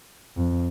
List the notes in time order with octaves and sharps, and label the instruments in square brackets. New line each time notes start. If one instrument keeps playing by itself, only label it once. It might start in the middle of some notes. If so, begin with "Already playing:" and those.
[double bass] F2